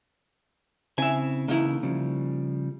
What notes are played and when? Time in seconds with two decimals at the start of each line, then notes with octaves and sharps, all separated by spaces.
0.98 C#3 C4 E4 E5 G#5
1.48 C#3 E3 A#3 D#4 E4
1.83 C#3 F3 G3